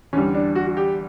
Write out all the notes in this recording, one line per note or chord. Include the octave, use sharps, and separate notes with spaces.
E2 D3 G3 C#4
D4
F#4
F#4
G4